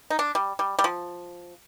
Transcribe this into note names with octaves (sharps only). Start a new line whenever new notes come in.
D#4
D4
G3
G3
G3
F3